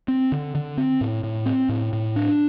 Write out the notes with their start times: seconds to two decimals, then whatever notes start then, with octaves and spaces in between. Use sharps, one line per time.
0.08 C4
0.32 D3
0.55 D3
0.77 C4
1.01 A2
1.23 A2
1.46 C4
1.69 A2
1.93 A2
2.16 D4